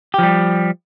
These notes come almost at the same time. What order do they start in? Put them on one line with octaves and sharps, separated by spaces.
G4 F3 G3